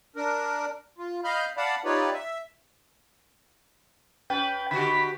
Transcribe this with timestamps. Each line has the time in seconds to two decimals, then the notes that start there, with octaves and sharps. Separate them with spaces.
0.16 D4 A#4
0.98 F4
1.24 D#5 F5 B5 F6 G6
1.57 D5 F5 F#5 A5 B5
1.85 D#4 F4 G4 B4 C#5 D5
2.14 E5
4.30 C#4 B4 G5
4.71 D3 F#4 G4 B5